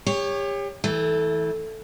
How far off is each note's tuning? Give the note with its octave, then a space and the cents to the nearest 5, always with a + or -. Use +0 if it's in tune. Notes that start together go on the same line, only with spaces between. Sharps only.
G4 +35 C#5 +0
E3 -30 A3 +0